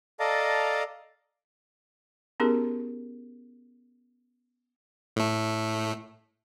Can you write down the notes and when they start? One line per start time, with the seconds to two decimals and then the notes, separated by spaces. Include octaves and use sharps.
0.20 A4 D5 D#5 F5 A5 A#5
2.40 B3 C#4 D#4 G4 G#4 A#4
5.16 A2 A3